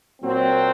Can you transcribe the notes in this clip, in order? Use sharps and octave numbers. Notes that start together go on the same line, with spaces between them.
A#2 F#3 C4